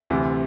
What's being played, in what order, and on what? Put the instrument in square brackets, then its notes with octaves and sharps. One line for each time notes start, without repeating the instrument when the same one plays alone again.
[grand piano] D2 C3 E3